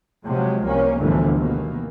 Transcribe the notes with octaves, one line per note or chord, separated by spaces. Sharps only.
C3 F3 F#3 G#3
C2 A#3 C#4
G1 D2 A#2 D3 E3 F3
B2 D#3 E3 A#3